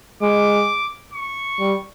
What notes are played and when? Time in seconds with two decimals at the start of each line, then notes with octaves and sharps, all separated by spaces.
0.22 G#3 D6
1.13 C#6
1.59 G3